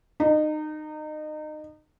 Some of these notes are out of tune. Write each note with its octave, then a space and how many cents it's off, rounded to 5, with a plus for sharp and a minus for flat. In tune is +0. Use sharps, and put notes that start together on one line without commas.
D#4 -25